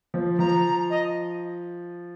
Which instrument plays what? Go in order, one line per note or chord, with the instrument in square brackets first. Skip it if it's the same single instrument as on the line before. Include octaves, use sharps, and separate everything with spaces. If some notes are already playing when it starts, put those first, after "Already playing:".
[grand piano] F3
[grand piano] F3 [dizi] A#5
[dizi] D#5